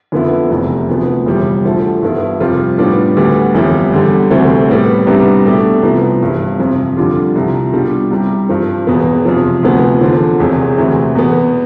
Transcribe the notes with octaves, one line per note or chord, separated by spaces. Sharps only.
F2 D3 F3 B3 E4
F1 E2 C3 E3
D2 C3 F3 B3
G1 F2 C3 E3 G3
D2 D3 F3 A3
G2 F3 B3 E4
F2 C3 G3 C4 F4
A2 G3 B3 D4 F4
D2 D3 G3 B3
G1 F2 E3 G3
E2 D3 G3
D2 C3 E3 A3 C4
A2 G3 B3
C2 C3 G3 B3 D4
B2 A3 D4 G4
C2 C3 F3 B3
G1 G2 E3
F2 C3 F3
F2 D3 G3 D4 F4
C2 C3 F3
B2 G3 D4 F4
C2 C3 G3
G2 F3 C4
E1 E2 B2 B3
F2 C3 F3
D2 C3 F3 B3
E2 D3 F3
E1 E2 C3
D2 C3 E3
E2 B2 B3